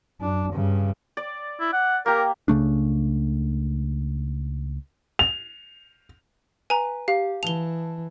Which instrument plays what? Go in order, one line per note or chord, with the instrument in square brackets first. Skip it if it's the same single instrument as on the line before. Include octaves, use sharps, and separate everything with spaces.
[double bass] F#2 D4
G2 C#3
[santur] D5
[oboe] E4
F#5
[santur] A#3 G4 [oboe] A#4
[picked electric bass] C#2 C#3 A3 D4
[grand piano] F7
[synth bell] B4 [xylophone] G#5 A#5
[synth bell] G4 [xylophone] F5
[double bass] E3 [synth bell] A5 [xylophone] F7 G7